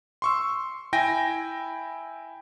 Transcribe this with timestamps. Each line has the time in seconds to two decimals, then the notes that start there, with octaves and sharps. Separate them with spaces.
0.22 C6 C#6 E6
0.93 E4 G5 G#5 A#6